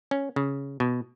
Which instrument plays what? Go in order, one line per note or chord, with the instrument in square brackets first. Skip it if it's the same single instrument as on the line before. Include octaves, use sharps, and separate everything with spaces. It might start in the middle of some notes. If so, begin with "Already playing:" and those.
[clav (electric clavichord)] C#4
C#3
B2